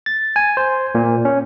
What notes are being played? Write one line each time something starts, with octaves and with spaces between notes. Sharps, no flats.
A6
G#5
C5
A#2
C#4